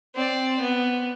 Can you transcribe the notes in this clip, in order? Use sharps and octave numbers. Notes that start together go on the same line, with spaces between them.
C4 D5
B3